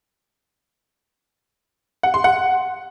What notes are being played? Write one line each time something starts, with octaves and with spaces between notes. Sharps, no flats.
F#5
C6
F#5